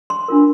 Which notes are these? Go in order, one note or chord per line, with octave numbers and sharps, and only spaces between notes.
C6
D4 F4 A#4